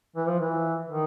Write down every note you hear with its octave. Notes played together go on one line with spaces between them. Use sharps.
E3
F3
E3
D#3